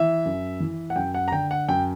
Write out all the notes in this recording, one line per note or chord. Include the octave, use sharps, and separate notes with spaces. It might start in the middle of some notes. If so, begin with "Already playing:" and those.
Already playing: E3 E5
F#2
E3
F#5
F#2 G5
F#5
A#5
D3 G5
F#5
F#2 G5